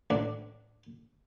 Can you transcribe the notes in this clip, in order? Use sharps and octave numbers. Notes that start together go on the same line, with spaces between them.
A1 D4